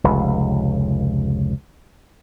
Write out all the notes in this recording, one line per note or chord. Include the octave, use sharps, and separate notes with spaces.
F1 C#2